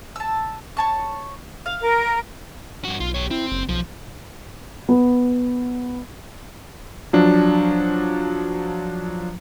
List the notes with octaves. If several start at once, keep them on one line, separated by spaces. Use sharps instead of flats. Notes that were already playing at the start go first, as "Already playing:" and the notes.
A5 E6
C#5 A5 C#6
F5
A#4
G2 F#4
B1 F4
G4 C#5
C4 E4
F#1
B1 F3
B3
F3 F#3 D4